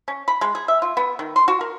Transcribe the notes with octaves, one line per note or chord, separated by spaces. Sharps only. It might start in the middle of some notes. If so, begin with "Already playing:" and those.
C#4
B5
G#3
G#4
E5
F4
B3
D#3
C6
F#4
A#4